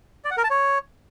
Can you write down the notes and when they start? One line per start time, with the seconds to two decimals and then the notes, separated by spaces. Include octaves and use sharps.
0.25 D5
0.31 F#5
0.37 A#4
0.44 A5
0.50 C#5